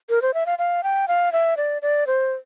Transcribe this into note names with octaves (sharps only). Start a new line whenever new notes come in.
A#4
C5
E5
F5
F5
G5
F5
E5
D5
D5
C5